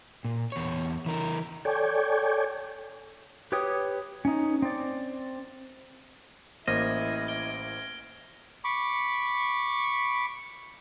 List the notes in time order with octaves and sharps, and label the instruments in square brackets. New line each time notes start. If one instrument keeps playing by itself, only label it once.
[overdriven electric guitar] A#2
E2 C#5
E3 A#4
[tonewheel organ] A4 C#5 D5 G5 G#5
[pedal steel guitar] G4 B4 C#5 G5 D#6
C#4 D#4
C4 D5
[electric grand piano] A1 A#3 C5 [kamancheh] E4 [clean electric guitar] D#5 [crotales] F6 G#6 A#6
[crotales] G#6 D7 G7
[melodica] B5 C#6 D6